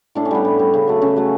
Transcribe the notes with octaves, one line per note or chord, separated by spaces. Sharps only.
A2 D4
C#4
G3 B3
A2
G3
C#3
F#3 A3
C#3 C#4
F#3 A3